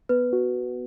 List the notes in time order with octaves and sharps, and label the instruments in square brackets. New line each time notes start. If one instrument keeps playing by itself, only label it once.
[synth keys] B3 [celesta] B4
[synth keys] F#4